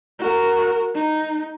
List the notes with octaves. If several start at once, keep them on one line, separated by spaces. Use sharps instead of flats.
F#4 A#4
D#4